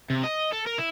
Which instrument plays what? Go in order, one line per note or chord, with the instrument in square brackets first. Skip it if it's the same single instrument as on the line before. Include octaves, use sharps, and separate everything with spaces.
[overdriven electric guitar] C3
D#5
A4
A#4
E4